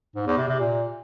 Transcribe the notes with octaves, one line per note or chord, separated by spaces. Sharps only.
G#2
E2
C3
C3
A#2